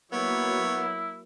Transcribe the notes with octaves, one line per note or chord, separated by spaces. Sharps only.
F#3 A#3 B3 E4 C#5